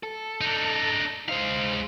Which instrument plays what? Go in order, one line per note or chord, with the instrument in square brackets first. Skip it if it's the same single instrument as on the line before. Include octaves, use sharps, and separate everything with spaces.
[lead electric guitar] A4
[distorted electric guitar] D4 D#4
[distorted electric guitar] G#3 F5 [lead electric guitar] D#4 C5